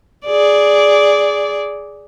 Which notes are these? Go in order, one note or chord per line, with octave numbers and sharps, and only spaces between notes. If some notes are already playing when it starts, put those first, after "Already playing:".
G#4 D5